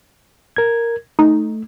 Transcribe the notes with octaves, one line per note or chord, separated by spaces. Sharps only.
A#4 G#6
A3 D#4